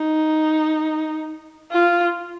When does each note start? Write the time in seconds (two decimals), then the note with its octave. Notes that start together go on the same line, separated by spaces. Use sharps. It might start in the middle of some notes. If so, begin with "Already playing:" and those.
Already playing: D#4
1.71 F4